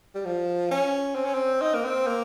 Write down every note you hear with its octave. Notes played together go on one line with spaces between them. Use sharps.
G3
F3
C#4
C4
C#4
C4
D#4
A#3
C4
A#3